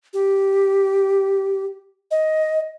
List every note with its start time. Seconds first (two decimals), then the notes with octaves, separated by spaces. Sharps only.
0.14 G4
2.11 D#5